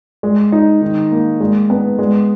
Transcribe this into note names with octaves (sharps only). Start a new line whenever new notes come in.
G#3
D#4
D#3
A#3
G#3
B3
G#3